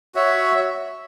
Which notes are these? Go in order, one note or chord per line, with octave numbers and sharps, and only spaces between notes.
F#4 C#5 E5